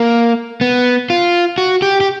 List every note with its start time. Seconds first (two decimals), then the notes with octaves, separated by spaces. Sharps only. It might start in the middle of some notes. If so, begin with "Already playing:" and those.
Already playing: A#3
0.61 B3
1.10 F4
1.58 F#4
1.82 G4
2.01 G4